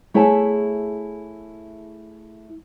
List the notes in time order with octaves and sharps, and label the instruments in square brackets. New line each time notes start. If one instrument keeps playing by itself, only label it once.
[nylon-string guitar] A3 E4 G#4 C#5 G#5 A5